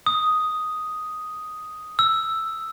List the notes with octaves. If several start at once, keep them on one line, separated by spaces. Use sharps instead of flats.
D#6
E6